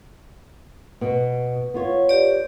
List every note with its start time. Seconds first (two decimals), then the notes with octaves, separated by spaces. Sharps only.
1.01 B2
1.74 B3 F4 C#5
2.09 G4 D5